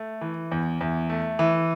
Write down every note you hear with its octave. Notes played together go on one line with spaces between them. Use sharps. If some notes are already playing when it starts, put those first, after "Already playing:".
Already playing: A3
E3
E2
E2
A3
E3